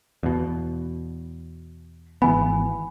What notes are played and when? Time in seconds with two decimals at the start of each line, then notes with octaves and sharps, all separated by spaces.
0.23 E2 B2
2.22 G#1 E3 B3 G#5 B5